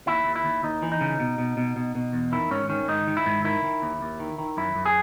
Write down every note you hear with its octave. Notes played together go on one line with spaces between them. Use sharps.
D#2 E4
D#2
E4
D#2
D#2 D#4
E3
D#4
C#3
B2
B2
B2
B2
B2
E2
D#3 E4
G#2 C#4
D#3 C#4
G#2 D#4
D#3
E4
G#2
D#3 E4
D#3
D#2
D#2
D#3
D#3
F#2 E4
F#2
G#4